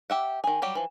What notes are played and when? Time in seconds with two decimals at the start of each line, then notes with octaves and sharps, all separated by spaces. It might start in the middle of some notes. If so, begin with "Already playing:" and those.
0.10 G4 E5 F#5
0.44 D#3 G#4
0.62 F#3 G3 G4
0.75 E3 F3